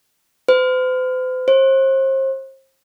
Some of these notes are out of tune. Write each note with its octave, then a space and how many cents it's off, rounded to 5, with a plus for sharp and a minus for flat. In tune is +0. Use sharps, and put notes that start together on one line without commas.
C5 -45
C5 +35